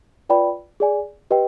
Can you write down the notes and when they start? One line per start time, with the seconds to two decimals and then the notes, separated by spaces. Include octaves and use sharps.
0.29 F4 B4 D5 G5 B5
0.80 G#4 D5 G#5
1.31 G4 B4 D#5 G5